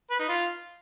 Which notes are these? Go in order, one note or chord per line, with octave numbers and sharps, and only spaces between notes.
B4
D#4
F4